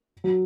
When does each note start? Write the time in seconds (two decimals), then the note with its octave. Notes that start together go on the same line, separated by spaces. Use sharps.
0.24 F#3